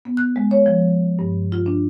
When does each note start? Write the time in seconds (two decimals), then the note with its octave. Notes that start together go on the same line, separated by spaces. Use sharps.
0.05 B3
0.17 F#6
0.36 G#3
0.51 C#5
0.66 F3
1.19 G2
1.52 F4
1.66 D4